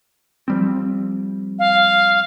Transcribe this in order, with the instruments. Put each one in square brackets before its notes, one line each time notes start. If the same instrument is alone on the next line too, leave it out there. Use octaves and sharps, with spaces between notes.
[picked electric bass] F3 G3 C4
[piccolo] F5